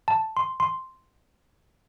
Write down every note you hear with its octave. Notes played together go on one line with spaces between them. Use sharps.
A5
C6
C6